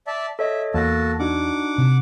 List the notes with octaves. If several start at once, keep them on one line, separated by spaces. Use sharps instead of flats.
D5 E5 A5
A4 C#5 D#5 E5
E2 A#3 F#4 A4 A5 A#6
D4 D#4 F#4 F#5 D6
C3